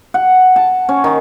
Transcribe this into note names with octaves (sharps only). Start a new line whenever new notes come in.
F#5
A5
C#4
D#3